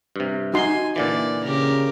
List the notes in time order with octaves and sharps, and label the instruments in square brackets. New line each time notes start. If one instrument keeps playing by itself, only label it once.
[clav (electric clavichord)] G2 C3
[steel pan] D#4 F#4 C6 [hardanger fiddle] G#5
[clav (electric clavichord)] A#2 D3 E3 [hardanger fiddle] D5
[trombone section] C#3 [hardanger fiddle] G4 A#4